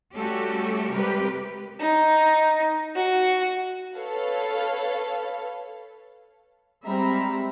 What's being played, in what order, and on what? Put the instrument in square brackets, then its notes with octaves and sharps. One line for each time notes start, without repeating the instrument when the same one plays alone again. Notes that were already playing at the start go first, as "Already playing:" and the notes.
[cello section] G3 A3 C#4 F#4 G4 A4
C3 G3 G#3 G4 A#4 B4
[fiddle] D#4
F#4
[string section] A4 B4 C#5 F5
[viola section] G3 G#3 C4 E5 A#5 B5